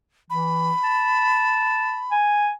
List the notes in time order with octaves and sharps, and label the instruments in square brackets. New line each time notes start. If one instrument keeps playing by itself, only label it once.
[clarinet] E3 [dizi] B5
[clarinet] A5
G#5